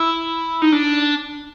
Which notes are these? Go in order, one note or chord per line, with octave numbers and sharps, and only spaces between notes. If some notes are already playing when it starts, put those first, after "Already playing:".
Already playing: E4
D#4
D4